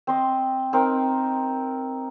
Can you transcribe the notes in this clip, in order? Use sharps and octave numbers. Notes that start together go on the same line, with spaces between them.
C4 C5 D#5
C4 D#4 A#4